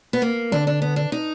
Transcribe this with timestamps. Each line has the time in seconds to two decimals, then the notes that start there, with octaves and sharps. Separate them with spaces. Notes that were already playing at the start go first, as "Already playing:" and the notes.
0.13 B3
0.22 A#3
0.52 D3 D4
0.67 D4
0.82 B3
0.96 D4
1.12 D#4